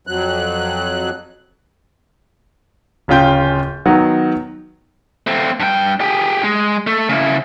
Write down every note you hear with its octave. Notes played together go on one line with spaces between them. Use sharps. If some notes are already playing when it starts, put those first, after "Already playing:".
F2 F#3 F#6
D1 C#3 C#4 F4 G5 G6
D#3 F#3 B3 D#4
A3 C4
G2 G5
G4 G#4
G#3
A3
C#3 E4